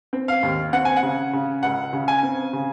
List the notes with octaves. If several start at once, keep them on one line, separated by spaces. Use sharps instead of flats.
C4
F5
D#2
C4 F#5
G#5
F#5
C#3
C#3
C#2 F#5
C#3
G#5
C4
C#3